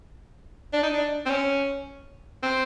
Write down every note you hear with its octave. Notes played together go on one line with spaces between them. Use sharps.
D4
D#4
D4
C4
C#4
C4